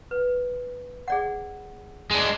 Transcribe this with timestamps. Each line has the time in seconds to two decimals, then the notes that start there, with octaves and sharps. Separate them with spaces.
0.11 B4
1.08 G#4 D5 F#5
2.11 G#3 D4